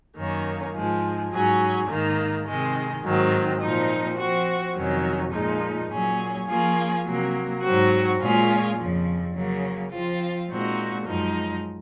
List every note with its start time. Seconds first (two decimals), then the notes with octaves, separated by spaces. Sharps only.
0.17 F#2 D#3 A#3 C#4
0.74 G#2 F3 G#3
1.32 G#2 F#3 C#4 G#4
1.89 G#2 D#3 A#3
2.46 C3 D#3 G#3
3.03 G#2 D#3 F#3 C4
3.61 A#2 F3 C4 D#4
4.18 F3 C4 F#4
4.75 F2 C3 D#3 F#3 C#4
5.33 A#2 F3 G#3 D#4
5.91 A#2 F#3 C#4 G#4
6.47 F3 A#3 C#4 F4 G#4
7.05 C3 F#3 A#3
7.62 G#2 F#3 C4 F#4
8.19 A#2 G#3 C#4 F4 G#4
8.76 F2 C#3 F3
9.34 C#3 F#3 A#3
9.91 F3 C4 F4
10.48 A#2 G#3 C4 D#4 F#4
11.06 F#2 F3 G#3 D#4